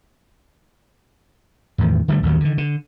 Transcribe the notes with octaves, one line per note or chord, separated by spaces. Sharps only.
E2 A2 D#3
D3 G3 A3
A1 D#2 D#3 F#3
D3 D#3
D3